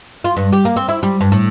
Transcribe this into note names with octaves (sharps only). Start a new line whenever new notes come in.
F4
G2
G4
A#3
C4
E4
G3
G2
A2